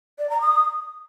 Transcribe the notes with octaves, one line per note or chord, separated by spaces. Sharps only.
D5
A#5
D#6